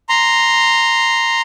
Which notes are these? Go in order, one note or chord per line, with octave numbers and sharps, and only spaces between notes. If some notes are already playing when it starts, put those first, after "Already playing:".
A#5 C6